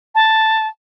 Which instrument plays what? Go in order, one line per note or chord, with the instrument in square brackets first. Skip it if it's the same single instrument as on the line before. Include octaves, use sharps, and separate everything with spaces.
[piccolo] A5